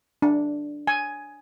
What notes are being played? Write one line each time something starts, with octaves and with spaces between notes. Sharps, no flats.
D4
G#5